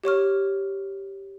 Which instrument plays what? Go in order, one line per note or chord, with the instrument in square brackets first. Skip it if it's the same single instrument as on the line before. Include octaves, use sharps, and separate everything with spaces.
[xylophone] G4 C#5 C#6 F6